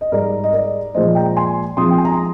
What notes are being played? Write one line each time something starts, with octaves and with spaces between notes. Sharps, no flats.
D#5
G#2 G3 A#4 D5
D#5
A#4 D5
A#2 F3 G#3 C5 D#5
G5 A#5
G#5 C6
C3 F3 G#3 C6 D#6
G5
G#5
A#5
C6